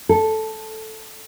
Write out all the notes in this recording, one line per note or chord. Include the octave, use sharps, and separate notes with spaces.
A4